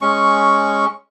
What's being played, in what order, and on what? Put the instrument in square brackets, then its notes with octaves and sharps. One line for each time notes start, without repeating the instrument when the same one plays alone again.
[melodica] G#3 C#4 C#6